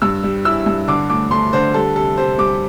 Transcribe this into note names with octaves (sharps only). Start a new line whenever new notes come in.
G2 E6
G3
E4 E6
G2
D3 D6
A3 D6
A3 C6
D3 C5
G3 A4
C3 A4
C3 C5
G3 D6